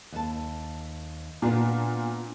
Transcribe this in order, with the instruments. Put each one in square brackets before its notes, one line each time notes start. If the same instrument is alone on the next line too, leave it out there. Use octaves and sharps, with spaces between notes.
[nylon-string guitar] D#2 A5
[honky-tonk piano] A#2 [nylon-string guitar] B3 D4 F5